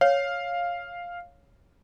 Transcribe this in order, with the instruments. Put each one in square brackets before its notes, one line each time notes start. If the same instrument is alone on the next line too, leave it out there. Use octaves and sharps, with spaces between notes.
[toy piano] C#5 [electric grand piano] F5